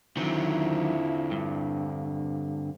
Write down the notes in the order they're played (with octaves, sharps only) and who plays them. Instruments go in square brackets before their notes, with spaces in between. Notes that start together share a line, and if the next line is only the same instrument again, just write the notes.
[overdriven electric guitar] D3 C4 [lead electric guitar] D#3 F#3 [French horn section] E4 F4
[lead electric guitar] G2